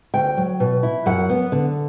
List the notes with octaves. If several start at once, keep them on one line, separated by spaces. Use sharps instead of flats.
D2 G5
F#3
B2
E4
F#2 F#5
B3
D3